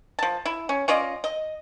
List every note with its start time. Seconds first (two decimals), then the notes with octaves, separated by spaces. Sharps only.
0.19 F3 A5
0.45 E4
0.69 C#4
0.88 C#4 F4 D5 D#5
1.24 D#5